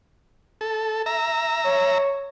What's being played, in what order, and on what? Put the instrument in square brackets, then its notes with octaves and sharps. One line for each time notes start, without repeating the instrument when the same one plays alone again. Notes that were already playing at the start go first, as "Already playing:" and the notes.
[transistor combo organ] A4
E5 A#5
[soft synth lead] C#5